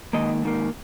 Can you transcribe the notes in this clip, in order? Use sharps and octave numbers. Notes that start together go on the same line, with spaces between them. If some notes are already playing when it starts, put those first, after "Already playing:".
G#2 D#3 A#3 D#5
G#2 D#3 A#3